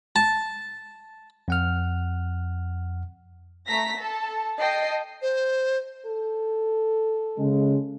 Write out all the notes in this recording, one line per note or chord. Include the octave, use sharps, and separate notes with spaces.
A5
F2 F#5 F6
A3 A#5 A#6 B6
A4 A5
D#5 G5 A5 C7
C5
A4
C#3 G#3